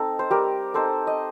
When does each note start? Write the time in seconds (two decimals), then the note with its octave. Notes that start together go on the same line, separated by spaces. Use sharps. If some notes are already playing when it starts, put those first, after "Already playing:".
Already playing: C4 D#4 A4
0.19 C5
0.31 G3 G4 A#4
0.74 C4 D#4 A4 C5
1.07 D#5